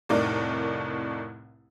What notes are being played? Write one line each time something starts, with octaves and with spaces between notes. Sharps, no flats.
F1 C2 A2 D#4 A#4 D5